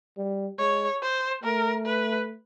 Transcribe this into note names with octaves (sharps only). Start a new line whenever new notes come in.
G3
G#3 C#5
C5
A3 A#4
B4